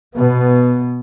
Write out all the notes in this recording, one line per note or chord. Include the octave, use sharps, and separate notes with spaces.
B2 B3